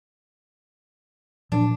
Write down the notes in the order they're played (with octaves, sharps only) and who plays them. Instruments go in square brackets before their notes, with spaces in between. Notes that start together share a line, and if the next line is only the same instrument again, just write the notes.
[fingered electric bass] A#2 F3 F#3 [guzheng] D4